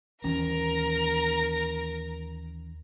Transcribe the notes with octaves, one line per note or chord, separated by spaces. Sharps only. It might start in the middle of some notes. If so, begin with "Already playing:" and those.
D#2 E3 C#4 A#4 A#5